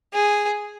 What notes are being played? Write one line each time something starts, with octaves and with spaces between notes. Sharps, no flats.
G#4